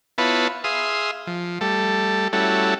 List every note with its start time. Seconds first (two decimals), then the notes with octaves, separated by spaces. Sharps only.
0.18 B3 E4 F4 B4 C#5 A5
0.64 G#4 E5 F5 C6 D#6
1.27 F3
1.61 G3 A3 A4
2.33 G3 A3 C#4 E4 F#4 A4